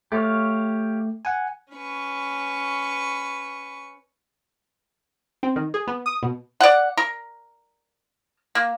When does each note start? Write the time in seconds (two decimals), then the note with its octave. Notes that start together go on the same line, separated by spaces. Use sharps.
0.12 A3 G4 C#5 F5
1.25 F#5 G#5
1.73 C#4 B4 C#6
5.43 C4
5.56 D#3
5.74 G#4
5.87 B3
6.06 D#6
6.23 B2
6.60 D5 F#5
6.97 A#4
8.55 A#3